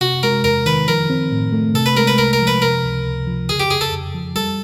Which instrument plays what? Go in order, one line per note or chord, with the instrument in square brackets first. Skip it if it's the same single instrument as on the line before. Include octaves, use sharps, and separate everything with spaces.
[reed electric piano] C3 [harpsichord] F#4
[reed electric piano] G#3 [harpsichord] A#4
[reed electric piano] E2 [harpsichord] A#4
[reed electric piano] D#3 [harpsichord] B4
[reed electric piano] F3 [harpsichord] A#4
[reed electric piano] C4
A2
A3
[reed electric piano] C3 [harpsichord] A4
[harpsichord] B4
[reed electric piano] G#3 [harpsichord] A#4
[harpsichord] B4
[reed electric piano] C2 [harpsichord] A#4
[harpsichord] A#4
[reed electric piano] F3
[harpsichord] B4
[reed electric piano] C3 [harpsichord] A#4
[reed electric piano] C#2
C#2
F3
[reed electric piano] C#3 [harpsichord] G#4
[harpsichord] G4
[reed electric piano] F2 [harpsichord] G#4
[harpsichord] A4
[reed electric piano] F2
F3
[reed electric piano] G3 [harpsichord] A4